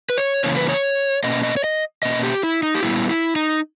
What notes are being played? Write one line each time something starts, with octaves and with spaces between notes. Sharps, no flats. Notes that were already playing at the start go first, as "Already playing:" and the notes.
B4
C#5
C#3 E3 A#3 C#4 C#5
B4
C#5
B2 A#3 C#4 D#5
D#5
C#5
D#5
B2 A#3 C#4 D#5
G4
E4
D#4
G4
A#2 G3 B3 E4
E4
D#4